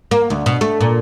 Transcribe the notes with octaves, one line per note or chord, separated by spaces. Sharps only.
A#3
D2
B2
A3
A#2